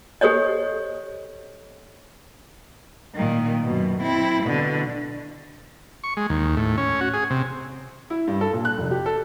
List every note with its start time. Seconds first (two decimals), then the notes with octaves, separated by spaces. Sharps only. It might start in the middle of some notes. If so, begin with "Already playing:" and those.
0.21 G4 A4 C5 C#5 D#5
3.15 A#2 D#3
3.64 F#2 B2
4.01 C4 E4
4.43 B2 D3
6.04 C#6
6.17 G#3
6.30 D#2
6.57 A2
6.78 C#4
7.01 F#4
7.14 G#4
7.30 C3
8.10 E4
8.27 G2
8.41 A4
8.53 A#2
8.65 F#6
8.78 F1
8.91 G4
9.06 A4